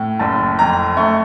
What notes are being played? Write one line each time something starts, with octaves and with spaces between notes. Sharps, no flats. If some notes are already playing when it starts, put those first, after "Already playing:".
Already playing: A2
F#1 A5
F2 A#5
A3 C#6